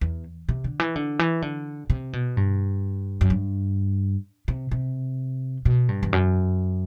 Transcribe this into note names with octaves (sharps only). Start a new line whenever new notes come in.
E2
C3
D3
E3
D3
E3
D3
C3
B2
G2
F#2
G2
C3
C3
B2
G2
E2
F#2